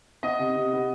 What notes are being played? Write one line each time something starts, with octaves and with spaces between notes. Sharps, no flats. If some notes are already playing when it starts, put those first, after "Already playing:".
B3 D#5
C3
C3
B3